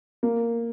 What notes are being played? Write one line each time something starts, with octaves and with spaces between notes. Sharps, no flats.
A#3